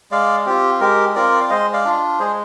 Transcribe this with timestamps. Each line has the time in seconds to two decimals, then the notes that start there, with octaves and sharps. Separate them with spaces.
0.11 G#3 D5 F5
0.46 C4 F4 G4
0.80 G#3 G4 A#4
1.15 C4 F4 A#4 D5
1.40 F5
1.50 G#3 C5 D#5
1.73 D5 F5
1.85 D4 F4
2.19 G#3 G#4 C5